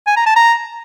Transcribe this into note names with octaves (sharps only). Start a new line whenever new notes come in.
G#5
A#5
A5
A#5